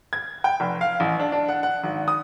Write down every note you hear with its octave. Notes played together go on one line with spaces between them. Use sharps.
G#6
G5
F1
F5
A1
D4
D4
F#5
F#5
G#1
D#6